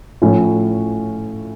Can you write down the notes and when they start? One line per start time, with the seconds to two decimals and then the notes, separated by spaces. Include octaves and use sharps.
0.22 A2 F3 C#4 E4